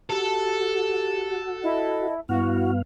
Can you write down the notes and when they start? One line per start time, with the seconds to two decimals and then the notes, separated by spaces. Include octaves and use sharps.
0.10 F#4 G4 A4
1.64 E4 D#5
2.29 G2 B3 E4 F#4 F5